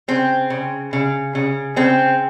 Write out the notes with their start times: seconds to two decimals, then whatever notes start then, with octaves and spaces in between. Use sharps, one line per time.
0.08 C#3 C4
0.50 C#3
0.93 C#3
1.35 C#3
1.76 C#3 C4